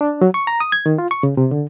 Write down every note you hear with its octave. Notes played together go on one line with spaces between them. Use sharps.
D4
F#3
C#6
A#5
D#6
G#6
D#3
F4
C#6
C#3
C3
D3